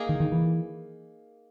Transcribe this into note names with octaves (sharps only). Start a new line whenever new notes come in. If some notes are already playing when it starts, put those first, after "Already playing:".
Already playing: A#3 D#4 G#4
D#3
D#3
E3